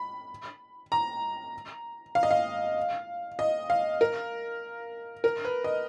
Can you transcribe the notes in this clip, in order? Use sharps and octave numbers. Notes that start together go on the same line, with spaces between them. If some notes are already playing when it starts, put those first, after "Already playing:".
Already playing: B5
A#5
F5
D#5
F5
D#5
F5
A#4
A#4
B4
D#5